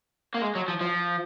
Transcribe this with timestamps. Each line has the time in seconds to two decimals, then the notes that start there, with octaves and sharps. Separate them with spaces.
0.34 A#3
0.42 G#3
0.55 F#3
0.68 F3
0.81 F3